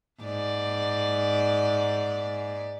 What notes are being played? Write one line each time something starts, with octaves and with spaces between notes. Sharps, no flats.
G#2 D5